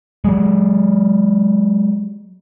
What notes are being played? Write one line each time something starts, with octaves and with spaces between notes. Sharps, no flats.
F#3 G#3